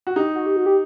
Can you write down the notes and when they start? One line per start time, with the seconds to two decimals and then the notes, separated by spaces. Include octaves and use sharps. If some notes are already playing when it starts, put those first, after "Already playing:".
0.07 F#4
0.16 D#4 G4
0.35 F#4
0.46 G4
0.57 F#4
0.66 G4